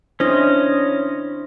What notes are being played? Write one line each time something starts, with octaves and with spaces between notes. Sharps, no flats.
C#4 D4 E4 C5 D#5